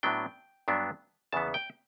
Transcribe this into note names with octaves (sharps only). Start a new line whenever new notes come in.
A2 F#3 B3 D4 G5
G2 F#3 B3 D4
E2 C#3 E3 B3 A5
G5